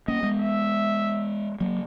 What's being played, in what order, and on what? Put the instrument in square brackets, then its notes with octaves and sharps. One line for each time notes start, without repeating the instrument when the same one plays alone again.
[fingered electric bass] A#3 C#4 [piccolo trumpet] D#5
[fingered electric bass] G#3 B3
[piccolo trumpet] E5
[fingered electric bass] F#3 A#3